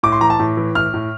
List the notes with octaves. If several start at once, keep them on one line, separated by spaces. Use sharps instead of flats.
A2 D6
C6
E3 A#5
A5
A2
E3
A2 F6
A2